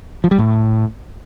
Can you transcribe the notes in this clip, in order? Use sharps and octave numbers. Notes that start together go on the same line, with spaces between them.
F3
G3
A2